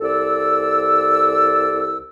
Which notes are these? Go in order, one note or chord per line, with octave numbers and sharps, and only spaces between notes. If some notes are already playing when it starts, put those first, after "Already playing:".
C2 A4 D5 E6